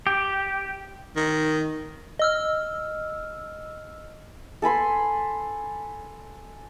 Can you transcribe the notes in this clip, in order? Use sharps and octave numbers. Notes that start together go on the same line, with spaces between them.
G4
D#3
D#5 E6 F6
A4 G#5 B5 C6